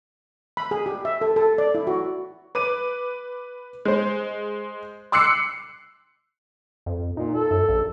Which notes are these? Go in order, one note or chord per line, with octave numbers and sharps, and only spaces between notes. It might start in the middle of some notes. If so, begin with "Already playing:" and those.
B5
G#4
G4
E5
A4
A4
D5
E4
F#4
B4 D6 D#7
G#3 C5
C6 D6 E6 F#6 C7 C#7
F2
A#2 D#4
A4
F#2
A#1